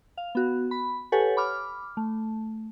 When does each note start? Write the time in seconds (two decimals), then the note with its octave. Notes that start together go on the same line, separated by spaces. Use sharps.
0.18 F5
0.35 B3 F#4
0.71 B5
1.12 G4 A4 B4 C#5 F#5 G#5
1.37 B5 D6 F6
1.97 A3